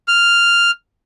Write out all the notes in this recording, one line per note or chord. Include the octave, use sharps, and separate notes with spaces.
F6